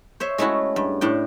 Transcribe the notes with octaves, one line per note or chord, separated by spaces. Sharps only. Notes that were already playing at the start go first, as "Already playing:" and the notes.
C5 C#5 E5
G#3 A3 C#4 E4 F#4
G2
A2 D4 G5